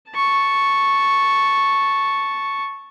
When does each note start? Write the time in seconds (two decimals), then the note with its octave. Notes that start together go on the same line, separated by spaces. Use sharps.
0.11 A5 C#6